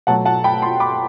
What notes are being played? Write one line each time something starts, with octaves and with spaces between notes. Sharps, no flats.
B2 F#3 A3 F#5 A5
F#5 A5
G5 B5
A5 C6
B5 D6